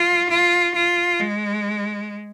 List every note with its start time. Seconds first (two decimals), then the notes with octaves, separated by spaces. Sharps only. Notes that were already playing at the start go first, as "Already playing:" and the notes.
Already playing: F4
0.31 F4
0.76 F4
1.20 G#3